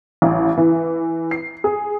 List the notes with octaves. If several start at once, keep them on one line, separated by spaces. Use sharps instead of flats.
A1
E3
C7
G#4